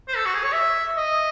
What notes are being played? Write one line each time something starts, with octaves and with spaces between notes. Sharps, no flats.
C5
A4
F#4
G#4
C#5
E5
D#5